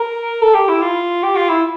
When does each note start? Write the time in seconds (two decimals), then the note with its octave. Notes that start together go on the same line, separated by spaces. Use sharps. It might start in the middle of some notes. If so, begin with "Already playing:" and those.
Already playing: A#4
0.42 A4
0.54 G4
0.68 E4
0.82 F4
1.23 G4
1.36 F4
1.49 E4